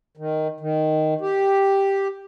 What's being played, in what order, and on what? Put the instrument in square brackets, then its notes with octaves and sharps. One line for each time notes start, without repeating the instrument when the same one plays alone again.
[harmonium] D#3
D#3
G4